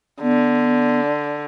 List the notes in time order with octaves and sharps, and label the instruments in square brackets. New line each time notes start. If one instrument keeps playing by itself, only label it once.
[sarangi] D3 [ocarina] B3